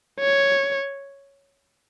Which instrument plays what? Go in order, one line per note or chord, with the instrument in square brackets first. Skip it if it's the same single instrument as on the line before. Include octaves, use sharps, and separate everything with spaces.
[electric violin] C#5